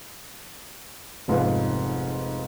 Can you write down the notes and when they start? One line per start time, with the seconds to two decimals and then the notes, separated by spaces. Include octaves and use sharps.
1.28 F1 G#2 B3 F4 B4